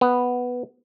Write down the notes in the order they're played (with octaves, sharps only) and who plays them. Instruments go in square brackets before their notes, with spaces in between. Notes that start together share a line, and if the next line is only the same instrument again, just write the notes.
[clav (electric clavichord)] B3